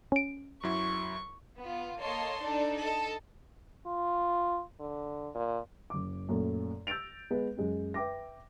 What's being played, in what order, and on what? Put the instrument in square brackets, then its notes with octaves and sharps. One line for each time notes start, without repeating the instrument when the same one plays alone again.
[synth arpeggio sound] C#4 D7
[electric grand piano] F#2 F#3 E4 [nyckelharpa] C#6
[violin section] B3 F4
A#3 A4 C#5 D#5 A5 C6
D4 D#4 A4 D5
A4 D#5 A5
[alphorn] F4
D3
A#2
[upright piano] F#1 D6
F#2 A#2 A3
E6 G6 A6 D7 F7
G#3 B3 B4
F#2 G#3 C#4
B4 E5 G5 D6 A#6